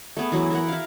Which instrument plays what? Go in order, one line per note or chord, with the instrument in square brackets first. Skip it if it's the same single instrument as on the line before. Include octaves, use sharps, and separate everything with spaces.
[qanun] A3 B3 G#4
E3 F#3 E4
E4 A#4 F#5
E4 F5